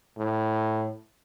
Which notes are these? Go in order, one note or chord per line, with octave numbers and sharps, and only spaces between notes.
A2